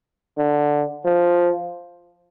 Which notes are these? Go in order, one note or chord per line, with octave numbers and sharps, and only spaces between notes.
D3
F3